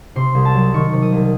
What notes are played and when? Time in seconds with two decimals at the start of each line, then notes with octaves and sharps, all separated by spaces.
0.16 C3 C6
0.35 C2
0.45 A5
0.55 F#3
0.74 D#3 C#6
0.93 C3
1.02 D#6
1.12 C2